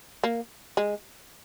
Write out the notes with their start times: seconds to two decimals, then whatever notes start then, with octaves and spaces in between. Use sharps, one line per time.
0.24 A#3
0.77 G#3